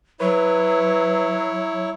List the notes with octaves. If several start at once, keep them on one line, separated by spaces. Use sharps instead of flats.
F#3 E4 B4 C#5